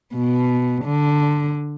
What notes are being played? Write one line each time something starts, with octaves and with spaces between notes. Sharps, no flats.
B2
D3